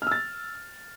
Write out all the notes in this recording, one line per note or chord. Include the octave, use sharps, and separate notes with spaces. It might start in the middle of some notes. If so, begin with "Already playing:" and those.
E6 F6 A6